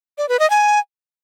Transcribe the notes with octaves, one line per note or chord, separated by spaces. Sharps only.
D5
B4
D#5
G#5